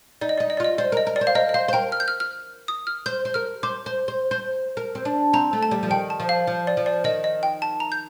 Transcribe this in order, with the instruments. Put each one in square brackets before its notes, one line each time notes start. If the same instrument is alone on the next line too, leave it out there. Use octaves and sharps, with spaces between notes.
[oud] D#4 [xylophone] D5
[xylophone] D#5
[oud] D#4 [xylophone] D5
[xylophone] D#5
D5
[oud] F4 [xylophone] D#5
[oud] C5 [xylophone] D5
[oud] A#4 [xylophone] D#5
[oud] A#4
[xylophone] D5
[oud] C5
[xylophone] F5
[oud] A#4 [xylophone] D#5
[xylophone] D#5
[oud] C5 [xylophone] F5
[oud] C5
[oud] A#4 [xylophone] G5
[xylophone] F6
G6
F6
F6
D#6
F6
[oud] C5 [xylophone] G6
[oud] C5
[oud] A#4 [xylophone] F6
[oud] C5 [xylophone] D6
[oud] C5
C5
C5
A#4
C4
D4
[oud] C4 [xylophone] A#5
[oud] A3
[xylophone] A5
[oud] G3
F3
[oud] D#3 [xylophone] G5
[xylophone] A5
[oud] F3
[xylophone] F5
[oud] F3
[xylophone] D5
[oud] F3
[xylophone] D5
[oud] D#3 [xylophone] D#5
[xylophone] D#5
G5
A5
A#5
G6